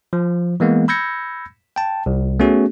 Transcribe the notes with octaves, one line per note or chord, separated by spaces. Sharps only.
F3
E3 G#3 A#3 B3
B5 E6 G6 G#6 A#6 C#7
G5 A5
C2
A3 B3 C#4 F#4 G#4